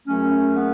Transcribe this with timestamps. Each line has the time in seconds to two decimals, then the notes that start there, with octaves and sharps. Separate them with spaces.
0.06 F#2 C#3 F#3 A3 C#4
0.55 B3